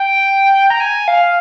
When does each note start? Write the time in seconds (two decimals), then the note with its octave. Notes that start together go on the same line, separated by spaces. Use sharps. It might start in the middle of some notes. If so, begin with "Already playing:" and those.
Already playing: G5
0.70 A#5
0.80 G#5
1.08 F5